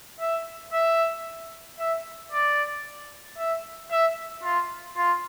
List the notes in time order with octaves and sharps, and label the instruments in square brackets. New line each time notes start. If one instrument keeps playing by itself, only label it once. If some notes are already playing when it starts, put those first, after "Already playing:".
[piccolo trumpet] E5
E5
E5
D5
E5
E5
F4
F4